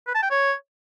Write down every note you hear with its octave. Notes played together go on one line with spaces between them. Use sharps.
B4
A5
G5
C#5